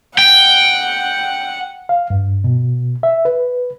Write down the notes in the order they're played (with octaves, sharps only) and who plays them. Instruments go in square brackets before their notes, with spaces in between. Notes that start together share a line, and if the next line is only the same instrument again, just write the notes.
[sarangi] F#5 [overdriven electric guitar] G5
[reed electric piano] F5
G2
B2
E5
B4